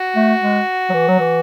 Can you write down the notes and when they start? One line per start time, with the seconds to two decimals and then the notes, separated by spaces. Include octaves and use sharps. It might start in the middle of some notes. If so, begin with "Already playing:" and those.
Already playing: F#4
0.16 A3
0.42 G#3
0.90 F#3
0.94 E3
1.08 F#3
1.20 E3